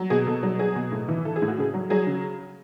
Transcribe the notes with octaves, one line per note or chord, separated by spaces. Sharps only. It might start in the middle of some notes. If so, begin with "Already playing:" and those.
Already playing: F#3
B2 G#4
B2 A4
F#3
F#3 G#4
B2
A2
E3
E3 A4
G#4
A2
F#4
C#3 G#4
F#3
F#3 G#4
C#3